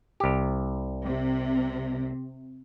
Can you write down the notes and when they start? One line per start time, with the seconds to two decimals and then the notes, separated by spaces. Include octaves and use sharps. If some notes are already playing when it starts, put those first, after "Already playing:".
0.20 C2 G4
1.04 C3